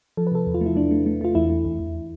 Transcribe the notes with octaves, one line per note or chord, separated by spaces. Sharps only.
F3 A4
B4
C3 A4
E2
F4
A3
E4
A3 D4
A3
A3
A3 F4
E2 E4
A3
E2
E2